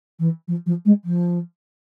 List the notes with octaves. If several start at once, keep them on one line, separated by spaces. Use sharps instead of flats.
E3
F3
F3
G#3
F3